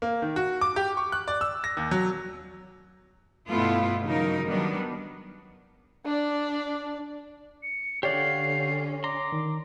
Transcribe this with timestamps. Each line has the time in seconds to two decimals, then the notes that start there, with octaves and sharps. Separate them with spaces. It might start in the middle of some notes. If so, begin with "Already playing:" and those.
0.02 A#3
0.22 D#3
0.36 F#4
0.61 D6
0.76 G4
0.97 C#6
1.12 F#6
1.28 D5
1.41 E6
1.64 A#6
1.77 D#2
1.91 F#3
3.47 G2 B2 A3 B3 E4 F4
4.04 C#3 E3 F#3 D#4 A#4
4.46 D#3 F#3 G3 B3 D4
6.05 D4 D5
7.63 C#7
8.03 D3 C#4 G4 C#5 D5 F5 F#5 C7
9.04 A#5 C6 D6
9.32 D#3